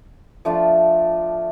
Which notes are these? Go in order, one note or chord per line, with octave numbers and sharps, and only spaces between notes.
F3 A3 D4 F4